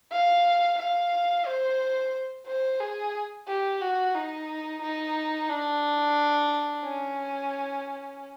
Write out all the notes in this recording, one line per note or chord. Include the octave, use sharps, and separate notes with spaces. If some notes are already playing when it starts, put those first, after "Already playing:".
F5
F5
C5
C5
G#4
G4
F#4
D#4
D#4
D4
C#4